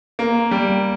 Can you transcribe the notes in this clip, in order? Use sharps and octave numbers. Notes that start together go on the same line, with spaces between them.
A#3
G3